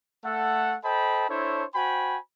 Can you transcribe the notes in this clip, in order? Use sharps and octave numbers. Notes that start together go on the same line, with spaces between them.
A3 A4 F#5
A4 C5 D#5 G5 A5 B5
D4 E4 A4 C5 C#5
F#4 C5 G5 G#5 B5